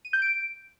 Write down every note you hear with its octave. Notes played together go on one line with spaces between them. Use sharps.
D#7
G6
D7